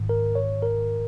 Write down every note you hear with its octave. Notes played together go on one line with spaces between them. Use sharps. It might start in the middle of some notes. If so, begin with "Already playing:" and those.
Already playing: G#2 D#3
A#4
C#5
A#4